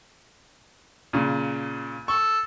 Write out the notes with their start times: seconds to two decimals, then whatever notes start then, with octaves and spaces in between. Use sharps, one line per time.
1.13 A#2 C#3
2.08 A4 C#6